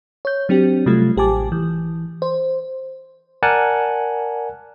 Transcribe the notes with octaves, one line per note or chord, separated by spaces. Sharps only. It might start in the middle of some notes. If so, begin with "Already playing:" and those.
C#5 G6
F#3 C4 D4 G4
C3 F#3 G3 A3 F4
A1 G4 G#5 A5 D6
E3
C5
A#4 D5 F#5 G#5 A5 F#6